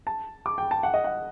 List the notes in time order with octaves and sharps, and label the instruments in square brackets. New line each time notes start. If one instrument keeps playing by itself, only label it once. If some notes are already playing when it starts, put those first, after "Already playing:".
[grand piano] A5
D6
G5
A5
F#5
D#5
F#5